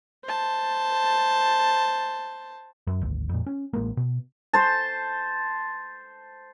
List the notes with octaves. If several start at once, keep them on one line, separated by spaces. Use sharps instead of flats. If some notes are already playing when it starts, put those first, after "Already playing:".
C5 A5
F#2
G#1 D2
F2 A#2
C#4
A1 G#3 A#3
B2
C5 A5